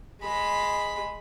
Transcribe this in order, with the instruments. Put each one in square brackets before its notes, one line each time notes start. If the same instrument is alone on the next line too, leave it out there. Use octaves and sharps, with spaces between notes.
[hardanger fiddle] G#3 B5